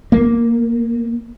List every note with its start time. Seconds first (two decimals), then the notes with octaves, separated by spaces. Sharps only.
0.12 A#3